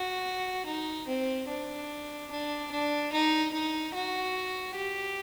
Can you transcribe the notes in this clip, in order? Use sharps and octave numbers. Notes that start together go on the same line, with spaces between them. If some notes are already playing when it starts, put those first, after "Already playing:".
Already playing: F#4
D#4
C4
D4
D4
D4
D#4
D#4
F#4
G4